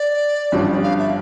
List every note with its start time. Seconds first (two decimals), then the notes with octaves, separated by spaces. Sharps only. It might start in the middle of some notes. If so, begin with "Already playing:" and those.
Already playing: D5
0.52 G1 G2 F3 C#4
0.83 F5
0.98 E5